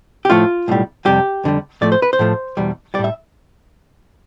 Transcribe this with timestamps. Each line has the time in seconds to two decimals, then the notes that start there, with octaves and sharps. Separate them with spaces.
0.25 G4
0.30 A2 F3 A3 F4
0.68 B1 A2 G3
1.05 F2 C3 G3 G4
1.44 F2 D3 G3
1.81 A2 F3 A3 D5
1.92 C5
2.02 B4
2.13 C5
2.19 A2 F3 A3
2.57 E2 B2 G3
2.94 G3 D5
2.99 A2
3.04 E5